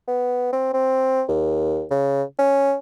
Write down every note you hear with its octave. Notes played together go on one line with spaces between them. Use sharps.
B3
C4
C4
D#2
C#3
C#4